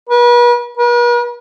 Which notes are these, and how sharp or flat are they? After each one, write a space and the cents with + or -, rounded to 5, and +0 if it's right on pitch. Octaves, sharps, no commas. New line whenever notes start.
B4 -40
B4 -45